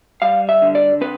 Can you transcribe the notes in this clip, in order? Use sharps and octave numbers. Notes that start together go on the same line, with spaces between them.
G3 F5
E5
D3
D5
C4 B4